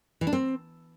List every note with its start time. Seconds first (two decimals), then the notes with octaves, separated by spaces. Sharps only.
0.21 E3
0.27 D4
0.33 C4